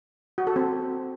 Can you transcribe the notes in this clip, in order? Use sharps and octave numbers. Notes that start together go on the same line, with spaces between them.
F#4
A4
C4